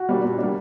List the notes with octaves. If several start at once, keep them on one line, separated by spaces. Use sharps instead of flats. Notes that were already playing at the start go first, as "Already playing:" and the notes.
Already playing: F#4
G3 A#3 D4
A#2
G3 A#3 D4